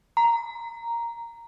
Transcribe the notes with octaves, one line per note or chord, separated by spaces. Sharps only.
A#5